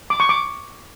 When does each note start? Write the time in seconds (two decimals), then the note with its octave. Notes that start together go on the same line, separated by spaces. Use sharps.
0.10 D6
0.20 C#6
0.29 D6